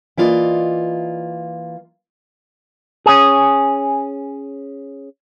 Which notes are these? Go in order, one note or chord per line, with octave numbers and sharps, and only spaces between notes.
E3 A#3 F4 D5 D#5
C#4 G#4